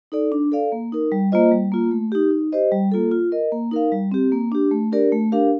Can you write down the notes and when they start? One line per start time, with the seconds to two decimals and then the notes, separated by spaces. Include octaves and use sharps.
0.12 D#4 A4 D5
0.32 D4
0.52 A4 D5 F5
0.72 A#3
0.92 D#4 A#4
1.12 G3
1.32 A#3 F4 C5 D#5
1.52 G3
1.72 A#3 F4
1.91 A3
2.12 D#4 G4
2.31 D#4
2.52 G4 C5 D#5
2.72 G3
2.92 A#3 F4 A4
3.12 F4
3.32 A#4 D#5
3.52 A#3
3.71 D#4 A#4 F5
3.92 G3
4.12 C4 G4
4.32 A#3
4.52 D4 G4
4.71 A3
4.92 D4 G4 A#4 D5
5.12 A3
5.32 D4 G4 A#4 F5